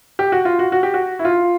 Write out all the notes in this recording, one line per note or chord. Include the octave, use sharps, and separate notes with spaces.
G4
F#4
F4
F#4
F#4
G4
F#4
E4
F4